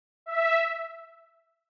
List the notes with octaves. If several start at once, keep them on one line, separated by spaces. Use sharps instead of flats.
E5